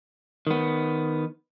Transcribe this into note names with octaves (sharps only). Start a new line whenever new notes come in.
D#3 B3